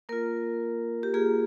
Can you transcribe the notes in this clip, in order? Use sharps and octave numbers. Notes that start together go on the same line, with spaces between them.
A#3 F4 A#4
G4
A#3 F4 G#4